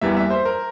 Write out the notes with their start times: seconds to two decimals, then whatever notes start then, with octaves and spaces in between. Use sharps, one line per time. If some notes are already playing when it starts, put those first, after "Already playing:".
0.01 E2 E3 G3 A#3 E5
0.17 E5
0.31 C5
0.45 A#4